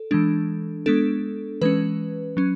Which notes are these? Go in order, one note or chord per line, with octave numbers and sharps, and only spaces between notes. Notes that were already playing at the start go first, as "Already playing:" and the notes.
Already playing: A4
E3 G#3 D4
G#3 B3 D4 A4
E3 G#3 C#4 B4
F#3 C#4